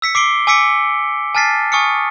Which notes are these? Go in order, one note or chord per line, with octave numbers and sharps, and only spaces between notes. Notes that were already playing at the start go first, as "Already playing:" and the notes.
E6 B6 C#7
D6 C7 D7 G7
G#5 D6 E6 B6 C#7 D7
G#5 A5 F6 A6 B6 C7
G#5 C#6 D#6 F6 C#7